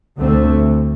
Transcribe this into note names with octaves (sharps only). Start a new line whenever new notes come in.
D2 D3 A3 C4